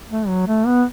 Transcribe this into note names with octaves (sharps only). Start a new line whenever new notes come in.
A3
F#3
A3
B3